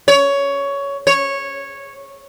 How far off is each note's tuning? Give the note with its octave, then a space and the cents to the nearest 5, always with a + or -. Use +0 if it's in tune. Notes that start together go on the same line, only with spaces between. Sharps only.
C#5 +15
C#5 -10